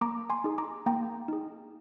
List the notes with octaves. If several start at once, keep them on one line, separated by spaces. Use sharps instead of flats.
A#3 A#5 D6
G#5 C6
D#4 G#4
A#5 D6
A#3 G5 A#5
D#4 G#4